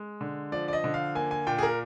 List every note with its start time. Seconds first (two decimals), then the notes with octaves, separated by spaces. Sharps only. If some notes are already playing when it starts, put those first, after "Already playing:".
Already playing: G#3
0.21 D3
0.52 F3 D5
0.68 D5
0.73 D#5
0.84 D3
0.94 F5
1.15 A#3 G#5
1.31 G#5
1.47 A#2 G5
1.58 G#4
1.63 A#4